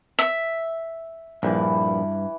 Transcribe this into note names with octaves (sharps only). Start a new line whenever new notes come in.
E5
A#1 G2 E3 B5